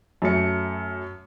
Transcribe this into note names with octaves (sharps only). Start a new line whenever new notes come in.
F#2 A3 C#7